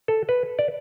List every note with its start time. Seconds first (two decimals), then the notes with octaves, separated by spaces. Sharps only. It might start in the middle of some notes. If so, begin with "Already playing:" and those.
0.08 A4
0.29 B4
0.59 D5